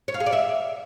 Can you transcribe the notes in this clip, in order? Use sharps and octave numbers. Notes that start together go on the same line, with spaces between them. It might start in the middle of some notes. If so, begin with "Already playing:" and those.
C#5
F5
G#4
D5
E5